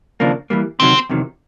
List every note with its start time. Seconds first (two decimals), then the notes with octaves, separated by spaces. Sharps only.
0.20 D#2 C#3 F3 A#3 D4
0.50 E3 G3 A#3
0.80 D2 C3 D#3 F#3 C4
1.09 E2 C3 D#3 F#3